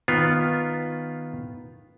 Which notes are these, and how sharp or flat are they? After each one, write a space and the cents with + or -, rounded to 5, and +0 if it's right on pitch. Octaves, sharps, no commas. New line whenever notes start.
D#3 +0 B3 +0 F4 +0